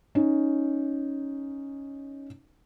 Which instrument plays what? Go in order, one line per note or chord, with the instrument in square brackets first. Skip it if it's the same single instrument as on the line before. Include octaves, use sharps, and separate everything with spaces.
[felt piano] C#4 D#4